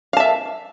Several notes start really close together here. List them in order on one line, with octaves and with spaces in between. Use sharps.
F5 A5 E5